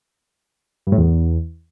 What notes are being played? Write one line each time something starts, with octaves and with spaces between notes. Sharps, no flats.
G2
A2
E2